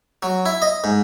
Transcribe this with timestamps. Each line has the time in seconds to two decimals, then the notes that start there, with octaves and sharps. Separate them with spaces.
0.23 F#3
0.46 E4
0.62 D#5
0.84 G#2